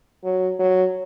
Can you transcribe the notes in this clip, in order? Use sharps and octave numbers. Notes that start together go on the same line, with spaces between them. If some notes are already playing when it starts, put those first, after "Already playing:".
F#3
F#3